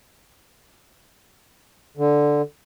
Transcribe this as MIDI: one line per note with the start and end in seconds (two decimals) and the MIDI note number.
1.97 2.42 50